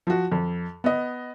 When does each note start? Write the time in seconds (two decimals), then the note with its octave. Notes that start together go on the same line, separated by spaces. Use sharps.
0.07 F3 F#4
0.32 F2
0.84 B3 D#5